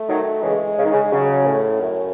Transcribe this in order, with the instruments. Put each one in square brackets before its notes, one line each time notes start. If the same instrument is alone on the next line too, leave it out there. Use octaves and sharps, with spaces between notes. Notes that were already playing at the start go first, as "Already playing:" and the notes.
Already playing: [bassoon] A3
[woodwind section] D#3 F#3
[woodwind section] C#3 E3 [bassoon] G#3
[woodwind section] C#3
D#3
C#3
[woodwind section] C#3 [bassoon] F#3
[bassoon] A2
F#2